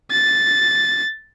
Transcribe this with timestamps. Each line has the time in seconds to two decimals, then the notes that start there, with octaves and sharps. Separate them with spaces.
0.11 A6